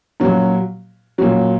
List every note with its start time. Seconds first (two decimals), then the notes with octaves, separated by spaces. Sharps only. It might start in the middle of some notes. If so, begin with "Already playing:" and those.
0.20 A#2 F#3 C#4 F#4
1.18 A#2 F#3 C#4 F#4